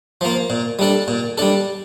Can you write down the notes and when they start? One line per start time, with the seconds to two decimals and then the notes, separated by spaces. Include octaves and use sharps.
0.21 F3 A#3
0.50 A#2
0.79 G3 D4 A4
1.08 A#2
1.38 G3 D4 A4